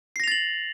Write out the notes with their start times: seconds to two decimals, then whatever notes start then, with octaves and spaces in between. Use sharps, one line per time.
0.16 C7
0.20 A#6
0.24 F7
0.28 A6
0.32 F#7